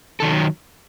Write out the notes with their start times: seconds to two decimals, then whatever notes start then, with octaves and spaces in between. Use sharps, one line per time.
0.20 D#3 F#3 A4